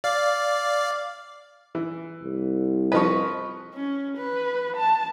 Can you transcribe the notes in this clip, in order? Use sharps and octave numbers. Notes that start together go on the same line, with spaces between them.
D5 F5
E3
C2
F3 B4 D#5 C#6
C#4
B4
A5